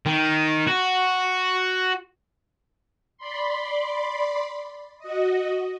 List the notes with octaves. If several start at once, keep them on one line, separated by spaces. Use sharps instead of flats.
D#3
F#4
D5 B5 C6
F#4 D#5